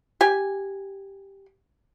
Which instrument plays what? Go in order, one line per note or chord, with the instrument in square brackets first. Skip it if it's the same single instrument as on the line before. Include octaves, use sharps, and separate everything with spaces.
[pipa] G4 G#5